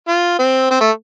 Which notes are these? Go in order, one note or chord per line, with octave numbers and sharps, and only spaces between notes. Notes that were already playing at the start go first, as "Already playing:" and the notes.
F4
C4
C4
A3